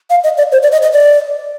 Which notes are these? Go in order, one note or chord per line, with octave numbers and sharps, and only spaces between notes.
F5
D#5
D5
C5
D5
D#5
D#5
D5